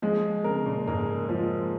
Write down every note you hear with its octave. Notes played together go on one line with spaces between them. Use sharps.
F3 G#3
C#3 A#4
C#3
A#2
G#2 A#4
F3